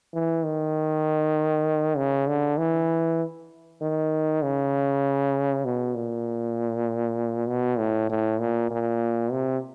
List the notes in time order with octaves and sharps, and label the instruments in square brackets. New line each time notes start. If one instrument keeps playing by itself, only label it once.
[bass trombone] E3
D#3
C#3
D3
E3
D#3
C#3
B2
A#2
B2
A2
A2
A#2
A#2
C3